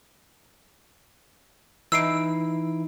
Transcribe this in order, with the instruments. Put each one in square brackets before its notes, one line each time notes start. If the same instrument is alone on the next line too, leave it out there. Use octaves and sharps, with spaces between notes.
[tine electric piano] E3 D#4 E4 [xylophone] E6 C7 D7